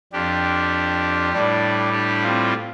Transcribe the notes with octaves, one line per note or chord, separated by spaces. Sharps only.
F2 F3 D4 G4
A2 G3 D4
D4 G4
C4 F4